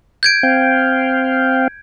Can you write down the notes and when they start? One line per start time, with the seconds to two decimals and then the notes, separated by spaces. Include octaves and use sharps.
0.23 G6 G#6 D7
0.43 C4 F5 G5